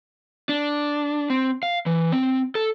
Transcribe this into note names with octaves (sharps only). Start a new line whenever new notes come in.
D4
C4
F5
E3
C4
A4